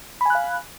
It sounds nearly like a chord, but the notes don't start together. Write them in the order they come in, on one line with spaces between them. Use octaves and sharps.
B5 G#5 F#6 F5